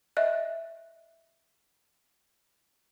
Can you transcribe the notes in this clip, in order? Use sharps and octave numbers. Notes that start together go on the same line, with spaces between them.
D#5 E5 F#6